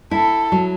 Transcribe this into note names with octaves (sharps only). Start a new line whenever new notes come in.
E4 A4
F#3